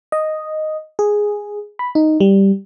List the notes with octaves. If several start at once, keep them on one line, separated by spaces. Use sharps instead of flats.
D#5
G#4
B5
D#4
G3